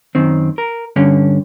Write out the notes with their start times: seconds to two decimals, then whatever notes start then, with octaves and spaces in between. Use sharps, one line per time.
0.15 F#2 D#3 C4
0.58 A#4
0.96 G2 D3 C#4